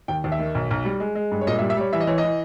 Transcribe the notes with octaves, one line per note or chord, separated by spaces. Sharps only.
D#2 G5
D#2
E5
D#3
B1
B1
G3
G#3
G#3
G2
C#5
A#2 D#5
E5
G3
E5
G3 C#5
E3 E5
D#5
E3 C#5
D#5
E3